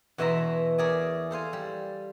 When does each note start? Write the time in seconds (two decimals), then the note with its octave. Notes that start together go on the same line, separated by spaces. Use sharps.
0.18 E2 B2 E4 C5 E5 A#5
0.78 G#4 A#4 C#5 D5 E5 G#5
1.31 A4 C5 F5 G#5
1.53 G3